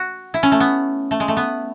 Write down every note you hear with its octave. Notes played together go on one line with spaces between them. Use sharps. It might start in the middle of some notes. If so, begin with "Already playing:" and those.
Already playing: F#4
E4
C#4
A3
B3
A3
G#3
A3
B3